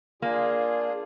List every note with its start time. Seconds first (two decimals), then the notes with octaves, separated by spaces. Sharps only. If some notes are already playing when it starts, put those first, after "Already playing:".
0.22 A#3 D4 F4 G#4